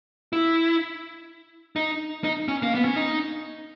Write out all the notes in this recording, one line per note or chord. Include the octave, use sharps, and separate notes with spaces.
E4
D#4
D#4
C#4
A#3
B3
C#4
D#4